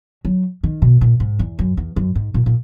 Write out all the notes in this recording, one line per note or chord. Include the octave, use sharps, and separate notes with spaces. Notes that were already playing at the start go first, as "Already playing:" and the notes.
F#3
D#3
B2
A#2
G#2
E2
F#2
E2
F#2
G#2
A#2
A#2